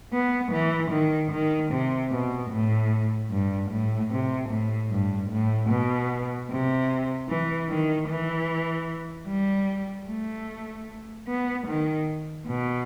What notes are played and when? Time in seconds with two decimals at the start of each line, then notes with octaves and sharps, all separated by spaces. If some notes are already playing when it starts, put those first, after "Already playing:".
0.13 B3
0.52 E3
0.91 D#3
1.31 D#3
1.71 C3
2.12 B2
2.51 A2
3.31 G2
3.71 A2
4.11 C3
4.50 A2
4.91 G2
5.31 A2
5.70 B2
6.50 C3
7.29 E3
7.69 D#3
8.09 E3
9.28 G3
10.08 A3
11.28 B3
11.68 D#3
12.47 B2